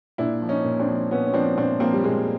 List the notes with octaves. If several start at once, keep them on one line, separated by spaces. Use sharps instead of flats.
A#2 D4 E4
F3
C#4 D#4
A#2
C4 D4
F3
A#2 B3 C#4
C#4
F3 C4 D4
A#2 C4 D4
F3 A#3 C4
G3
A#2 G#3